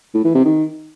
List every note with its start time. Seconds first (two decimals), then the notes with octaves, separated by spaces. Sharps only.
0.14 A2
0.24 E3
0.35 C3
0.45 D#3